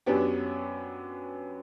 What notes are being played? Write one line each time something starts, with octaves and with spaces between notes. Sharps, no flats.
F#2 F#3 B3 D4 G4